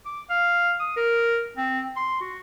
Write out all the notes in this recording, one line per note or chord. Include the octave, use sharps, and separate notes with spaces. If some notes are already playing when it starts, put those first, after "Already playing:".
D6
F5
D#6
A#4
C4
C6
F#4